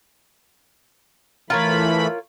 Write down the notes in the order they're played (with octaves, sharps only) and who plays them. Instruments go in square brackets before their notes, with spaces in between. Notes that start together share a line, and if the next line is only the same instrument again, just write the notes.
[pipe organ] E3 A3 B5 [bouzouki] F4 A#4 C#5